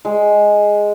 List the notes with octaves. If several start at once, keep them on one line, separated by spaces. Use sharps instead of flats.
G#3